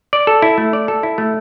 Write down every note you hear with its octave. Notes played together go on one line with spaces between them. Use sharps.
D5
A4
E4
A3
D5
A4
E4
A3